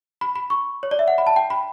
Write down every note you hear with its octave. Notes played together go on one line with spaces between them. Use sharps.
B5
B5
C#6
C#5
D5
E5
F#5
B5
A5
G5
B5